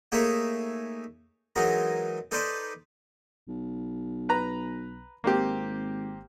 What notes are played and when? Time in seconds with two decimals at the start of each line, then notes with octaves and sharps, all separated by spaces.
0.12 A3 A#3 D#4 G#4 C#5 E5
1.56 E3 F#3 G#3 D#4 A#4
2.31 D#4 A4 B4 C5 D5
3.48 B1
4.29 B4 A#5
5.24 G#1 A#3 C4 G4